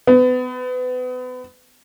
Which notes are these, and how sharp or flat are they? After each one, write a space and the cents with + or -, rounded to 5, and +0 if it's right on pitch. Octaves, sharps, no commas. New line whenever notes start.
B3 +30